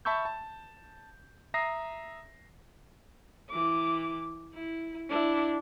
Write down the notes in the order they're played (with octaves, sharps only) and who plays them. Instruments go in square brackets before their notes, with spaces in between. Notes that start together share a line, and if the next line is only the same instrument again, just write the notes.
[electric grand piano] E5 A5 B5 C#6 E6 G6
A5
E5 A#5 D#6 A#6 C7
[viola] E3 D6
E4
D4 E4